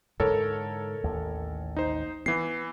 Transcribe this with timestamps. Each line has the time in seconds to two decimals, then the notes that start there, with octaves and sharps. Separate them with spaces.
0.20 G#2 D3 E3 A4 A#4 C#5
1.04 A1 D#2
1.76 D#4 C5
2.26 E3 B3 C7